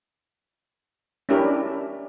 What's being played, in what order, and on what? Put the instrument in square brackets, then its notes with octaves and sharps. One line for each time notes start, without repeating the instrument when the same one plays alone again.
[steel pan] C#4 D4 E4 G4 A#4